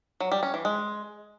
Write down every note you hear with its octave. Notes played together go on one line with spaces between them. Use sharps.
F#3
G3
C#4
E3
G#3